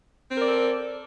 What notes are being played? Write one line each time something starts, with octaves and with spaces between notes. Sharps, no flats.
C4 A4 A#4 D5